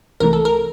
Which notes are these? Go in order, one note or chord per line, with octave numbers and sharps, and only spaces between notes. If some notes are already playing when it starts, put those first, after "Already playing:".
C2 C3 E3 A3 A#4
A4
A#4